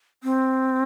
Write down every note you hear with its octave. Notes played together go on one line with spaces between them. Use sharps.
C4